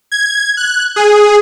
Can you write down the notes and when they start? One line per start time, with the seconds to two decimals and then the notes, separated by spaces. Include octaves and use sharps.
0.12 G#6
0.57 F#6
0.96 G#4